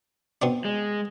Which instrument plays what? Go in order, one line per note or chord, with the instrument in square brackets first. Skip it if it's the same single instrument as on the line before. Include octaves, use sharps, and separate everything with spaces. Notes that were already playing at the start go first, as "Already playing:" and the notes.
[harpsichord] B2 C4 D4
[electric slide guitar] G#3